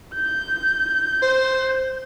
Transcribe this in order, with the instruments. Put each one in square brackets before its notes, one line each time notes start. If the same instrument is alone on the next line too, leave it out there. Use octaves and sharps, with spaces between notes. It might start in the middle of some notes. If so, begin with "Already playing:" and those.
[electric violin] G6
[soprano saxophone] C5